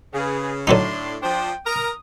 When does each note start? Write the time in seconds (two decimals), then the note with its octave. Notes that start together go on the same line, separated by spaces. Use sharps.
0.13 C#3 G#4 B4
0.67 A2 D3 F#3 D4 D#4 C6
1.23 F3 D4 C5 G5
1.66 A#4 A#5 D#6